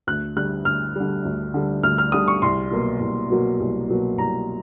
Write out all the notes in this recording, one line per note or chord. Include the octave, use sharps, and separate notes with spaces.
D2 F#6
D3 G3 F#6
D2 F6
D3 G3
D2
D3 G3
D2 F6
F6
D3 G3 D#6
C#6
C2 C6
B2 F#3 A#3
C2
B2 F#3 A#3
C2
B2 F#3 A#3
C2 A#5